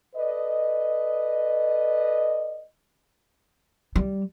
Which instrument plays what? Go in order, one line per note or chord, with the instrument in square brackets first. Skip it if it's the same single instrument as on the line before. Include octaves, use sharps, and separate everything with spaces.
[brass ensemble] A4 B4 D5 D#5
[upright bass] G3